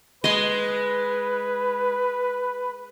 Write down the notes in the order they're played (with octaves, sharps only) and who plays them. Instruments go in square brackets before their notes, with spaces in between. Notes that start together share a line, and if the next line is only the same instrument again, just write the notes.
[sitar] G#3 [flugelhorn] B4 [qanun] D#5 C6